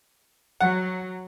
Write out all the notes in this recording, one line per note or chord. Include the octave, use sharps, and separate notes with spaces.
F#3 F#5